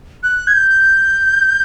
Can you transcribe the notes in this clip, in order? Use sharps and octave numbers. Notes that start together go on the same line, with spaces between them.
F#6
G#6
G6